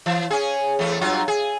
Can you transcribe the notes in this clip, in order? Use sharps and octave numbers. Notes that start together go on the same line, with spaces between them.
E3
C#4 G#4
E2 A3
G2 F#3 F4
G#4